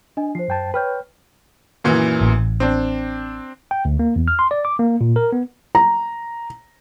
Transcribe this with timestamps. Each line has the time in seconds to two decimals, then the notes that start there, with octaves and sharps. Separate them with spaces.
0.17 D4 D#5 G#5
0.35 F3 C5 C7
0.48 F#2 G5 A5
0.74 B4 C#5 G5 F6 G6
1.84 F#2 A#2 E3
2.21 A1
2.60 C4 D4
3.71 G5
3.85 D2
3.99 A#3
4.16 E2
4.28 F6
4.39 C6
4.51 D5
4.65 D6
4.79 A#3
5.01 A#2
5.16 A#4
5.32 B3
5.75 A#5